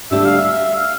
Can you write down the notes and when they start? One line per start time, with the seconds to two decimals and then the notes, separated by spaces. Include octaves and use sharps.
0.11 D2 D3 G3 D4 G4 E5
0.25 F5
0.38 E5
0.76 F5